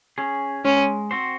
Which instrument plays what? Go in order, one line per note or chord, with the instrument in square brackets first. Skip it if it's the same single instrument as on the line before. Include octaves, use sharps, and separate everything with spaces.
[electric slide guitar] C#4 G#4
[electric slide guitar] G#3 [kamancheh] C#4
[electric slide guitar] C4 F#4 C5